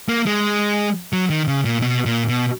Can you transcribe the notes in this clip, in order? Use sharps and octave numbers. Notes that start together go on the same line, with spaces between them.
A#3
G#3
F#3
D#3
C#3
A#2
B2
A#2
B2